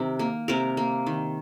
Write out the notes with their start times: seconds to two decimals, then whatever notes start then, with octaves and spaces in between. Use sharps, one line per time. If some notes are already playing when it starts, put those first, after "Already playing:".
Already playing: C3 D#3 A#4
0.19 A#3
0.48 C3 A#4
0.77 A#3
1.06 D#3